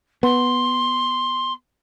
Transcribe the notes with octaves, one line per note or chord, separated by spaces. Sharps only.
B3 C6